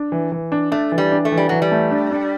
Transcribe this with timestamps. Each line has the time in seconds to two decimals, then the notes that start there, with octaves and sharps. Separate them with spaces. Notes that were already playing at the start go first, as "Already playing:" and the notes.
Already playing: D4
0.12 E3
0.32 E3
0.52 D4
0.72 A3 D4
0.92 E3
0.98 G3
1.12 D4
1.25 A3
1.32 E3
1.38 G3
1.49 E3 F#3
1.62 G3
1.71 A3
1.91 D4
2.11 D4